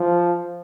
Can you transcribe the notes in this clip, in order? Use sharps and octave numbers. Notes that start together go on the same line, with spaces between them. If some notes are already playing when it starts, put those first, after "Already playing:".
Already playing: F3